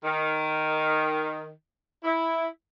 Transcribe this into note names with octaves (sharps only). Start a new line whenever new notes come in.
D#3
E4